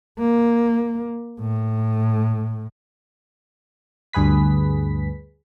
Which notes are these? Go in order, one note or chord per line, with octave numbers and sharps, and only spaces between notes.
A#3
A2
D2 G2 G#4 B4 B6